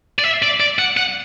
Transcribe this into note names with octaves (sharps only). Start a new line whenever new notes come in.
D5
E5
D5
D5
F#5
F#5